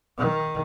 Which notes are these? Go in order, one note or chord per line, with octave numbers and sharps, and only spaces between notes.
D#3